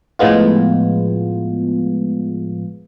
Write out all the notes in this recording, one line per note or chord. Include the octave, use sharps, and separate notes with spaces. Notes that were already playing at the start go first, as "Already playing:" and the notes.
A2 F3 G#3 B3 F4